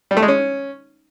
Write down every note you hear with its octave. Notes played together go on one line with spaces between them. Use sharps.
G3
A3
G#3
C#4